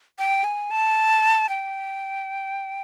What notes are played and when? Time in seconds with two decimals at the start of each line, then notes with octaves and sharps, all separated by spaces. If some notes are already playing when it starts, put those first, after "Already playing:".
0.19 G5
0.44 G#5
0.71 A5
1.49 G5